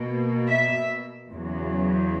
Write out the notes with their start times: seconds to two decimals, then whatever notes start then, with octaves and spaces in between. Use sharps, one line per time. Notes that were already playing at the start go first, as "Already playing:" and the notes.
Already playing: B2 A#3
0.48 E5
1.30 E2 C#3 F#3